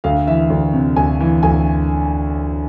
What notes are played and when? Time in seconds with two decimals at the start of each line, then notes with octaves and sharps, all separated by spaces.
0.04 D2 F5
0.27 E3 E5
0.50 D2
0.74 C3
0.96 D2 G#5
1.21 E3
1.43 D2 G#5